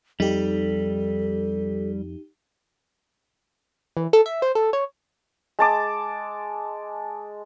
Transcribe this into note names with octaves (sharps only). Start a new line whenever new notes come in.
F2 G3 D#4 G4 A4
E3
A4
E5
C5
A4
C#5
G#3 A5 D6